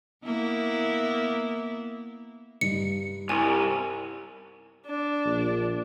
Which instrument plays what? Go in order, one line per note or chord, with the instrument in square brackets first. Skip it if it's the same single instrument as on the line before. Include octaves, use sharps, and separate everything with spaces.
[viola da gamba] A#3 B3 E4
[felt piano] G2 D#4 [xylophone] C#7
[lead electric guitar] C2 [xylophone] G#5
[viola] D4
[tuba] A#1